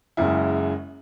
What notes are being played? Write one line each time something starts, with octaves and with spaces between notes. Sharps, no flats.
F#1 F#2 C#3 G#3 E4